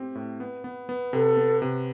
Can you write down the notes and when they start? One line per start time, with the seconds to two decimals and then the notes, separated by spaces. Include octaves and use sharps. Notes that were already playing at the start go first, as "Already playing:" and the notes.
Already playing: A2 C4 G4
0.15 A2
0.40 B3
0.64 B3
0.89 B3
1.13 C3 A4
1.37 B3
1.62 C3